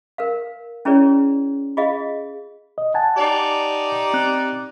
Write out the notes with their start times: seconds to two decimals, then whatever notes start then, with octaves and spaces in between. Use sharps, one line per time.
0.18 A#4 B4 F5
0.85 C#4 E4 G#4 B4 C#5 D5
1.77 F4 G#4 D#5 F5
2.78 D#5
2.94 F#5 G#5 A5
3.17 D#4 G4 D5
4.14 C4 F#6